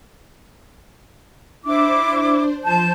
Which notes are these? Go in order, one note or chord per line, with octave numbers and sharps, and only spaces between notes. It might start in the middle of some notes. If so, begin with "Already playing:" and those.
D4 E4 C5 D6
F3 C5 A5 G6